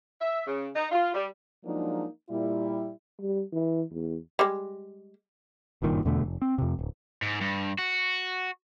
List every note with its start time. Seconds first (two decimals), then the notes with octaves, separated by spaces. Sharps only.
0.21 E5
0.47 C#3
0.76 D#4
0.92 F4
1.14 G3
1.65 F3 F#3 G#3 A#3 D4 D#4
2.30 A#2 G3 E4
3.21 G3
3.52 E3
3.92 E2
4.39 G3 G#3
5.82 F#1 G2 A#2 D#3
6.05 E2 B2 D3 A3
6.22 F1
6.42 C4
6.58 F2 C3
6.79 D1
7.22 G#2
7.41 G2
7.79 F#4